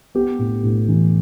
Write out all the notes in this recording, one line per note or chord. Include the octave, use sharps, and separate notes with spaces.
B3 G4
A2
A2
E3